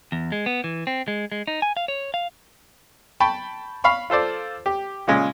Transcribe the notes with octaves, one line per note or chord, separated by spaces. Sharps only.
E2
G#3
B3
E3
C4
G#3
G#3
D#4
G#5
F5
C#5
F5
G5 A5 B5 C#6
F5 B5 C#6
F4 A4 C5 D5
G4
A#2 C#3 G#3 C#4